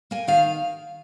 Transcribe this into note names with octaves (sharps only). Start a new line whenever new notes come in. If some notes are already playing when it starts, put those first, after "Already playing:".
A#3 G#5
D#3 F5